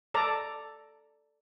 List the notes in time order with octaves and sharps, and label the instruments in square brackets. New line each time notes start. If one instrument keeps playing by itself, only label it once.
[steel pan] A4 D5 A#5